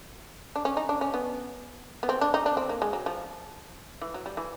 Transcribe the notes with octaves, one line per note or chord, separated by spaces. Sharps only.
D4
C#4
D#4
D4
C#4
B3
B3
C4
D4
D#4
D4
C4
A#3
G#3
F#3
F3
E3
F#3
G3
E3